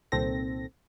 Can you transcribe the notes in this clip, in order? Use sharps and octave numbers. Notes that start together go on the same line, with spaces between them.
C2 A#2 D#3 C4 A4 A#6